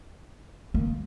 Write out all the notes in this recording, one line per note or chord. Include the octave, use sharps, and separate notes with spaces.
A#3